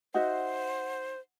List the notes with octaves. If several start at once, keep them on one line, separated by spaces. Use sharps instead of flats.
D#4 F#4 C5 E5 F#5